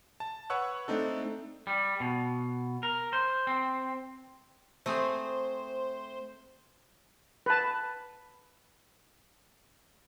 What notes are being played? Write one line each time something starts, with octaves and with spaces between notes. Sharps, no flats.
A5
B4 C#5 F#5 C#6 E6 F#6
A3 C4 D4 D#4 A4
G3
B2
A#4
C5
C4
A3 C4 G#4 C5
B4 A5